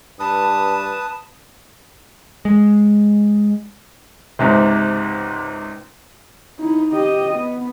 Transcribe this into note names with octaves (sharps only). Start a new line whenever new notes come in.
G2 B4 A5 D#6
G#3
C#2 G#2 C3
D#4 E4
G4 D#5
B3